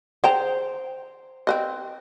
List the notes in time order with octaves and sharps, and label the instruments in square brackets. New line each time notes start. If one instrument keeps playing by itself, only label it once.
[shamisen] G#4 G5 A#5 [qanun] C5
[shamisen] C4 B4 D#5